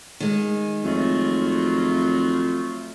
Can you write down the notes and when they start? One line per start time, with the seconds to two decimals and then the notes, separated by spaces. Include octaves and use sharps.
0.20 D#3 G#3
0.84 F2 F#3 A3 F4